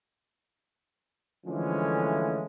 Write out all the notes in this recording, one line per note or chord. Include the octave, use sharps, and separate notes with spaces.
D3 E3 F3 G#3 A3 C#4